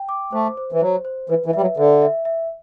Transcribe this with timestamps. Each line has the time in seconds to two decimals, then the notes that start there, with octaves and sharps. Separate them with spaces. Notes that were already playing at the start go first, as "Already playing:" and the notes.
Already playing: G5
0.09 D6
0.33 A3 C5
0.57 C5
0.72 E3
0.81 F#3 C5
1.05 C5
1.29 E3 B4
1.46 E3
1.53 G3 E5
1.61 F#3
1.77 D3 E5
2.02 E5
2.25 E5